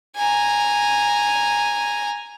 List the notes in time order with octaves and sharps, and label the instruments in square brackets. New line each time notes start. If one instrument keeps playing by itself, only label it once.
[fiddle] G#5 A#5